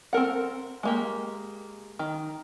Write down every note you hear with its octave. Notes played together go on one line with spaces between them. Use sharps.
C4 A4 A#4 F#5
G#3 A#3 G4
D#3